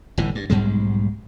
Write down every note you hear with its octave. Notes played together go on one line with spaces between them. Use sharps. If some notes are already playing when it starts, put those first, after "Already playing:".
G1 A2 E3
G2
B1 G#2 G3 G#3